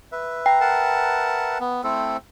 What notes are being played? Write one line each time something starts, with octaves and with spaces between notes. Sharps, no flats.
B4 E5
G5 A#5
A#4 F#5 A5
B3
A3 C4 E4 A4 C5